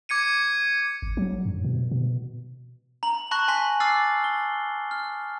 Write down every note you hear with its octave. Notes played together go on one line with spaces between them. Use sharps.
D6 G#6 C#7 D#7
G#1
F#3
F#2
B2
B2
A#5 F#7
A5 B5 C#6 F#6 A#6
G#5 C6 A#6 B6 F#7
D6 E6 F6 A6 C7
G7
F6